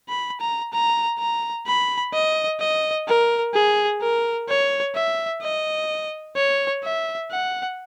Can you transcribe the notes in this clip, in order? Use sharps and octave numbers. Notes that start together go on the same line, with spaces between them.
B5
A#5
A#5
A#5
B5
D#5
D#5
A#4
G#4
A#4
C#5
E5
D#5
C#5
E5
F#5